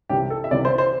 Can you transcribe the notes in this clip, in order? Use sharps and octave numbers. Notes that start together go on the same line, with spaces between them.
C2 C3 E3 G4
A4
E5
C2 C3 E3 D5
C5
C5